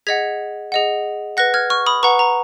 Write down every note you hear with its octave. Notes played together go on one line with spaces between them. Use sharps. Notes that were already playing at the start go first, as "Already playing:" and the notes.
G#4 D#5 F#5 G#6 B6
G#4 D#5 F#5
B4 F#5 F#6 A#6
F6 G#6
C#6 F6
B5 D#6
B4 F#5 A#5 C#6
A#5